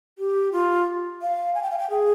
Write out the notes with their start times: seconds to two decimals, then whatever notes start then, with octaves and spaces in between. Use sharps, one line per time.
0.18 G4
0.52 F4
1.22 F5
1.55 G#5
1.63 G5
1.70 F5
1.78 G5
1.90 G#4